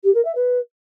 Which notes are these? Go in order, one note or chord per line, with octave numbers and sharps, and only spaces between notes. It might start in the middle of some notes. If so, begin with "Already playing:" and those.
G4
A#4
E5
B4